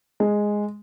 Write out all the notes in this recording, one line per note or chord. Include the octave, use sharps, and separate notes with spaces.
G#3